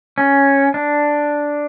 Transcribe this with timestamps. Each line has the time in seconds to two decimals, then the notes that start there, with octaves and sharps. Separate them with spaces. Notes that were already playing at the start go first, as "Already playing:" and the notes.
0.18 C#4
0.74 D4